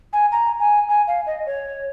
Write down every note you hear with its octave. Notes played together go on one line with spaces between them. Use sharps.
G#5
A#5
G#5
G#5
F5
D#5
C#5